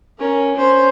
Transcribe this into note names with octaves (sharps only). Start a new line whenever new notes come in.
C#4 A#4
C#4 C5